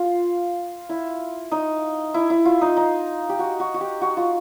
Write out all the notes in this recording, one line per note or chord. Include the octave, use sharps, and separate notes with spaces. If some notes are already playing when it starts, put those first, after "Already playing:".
Already playing: F4
E4
D#4
E4
E4
F4
D#4
D#4
G4
F#4
F#4
F#4
G4
F#4
F4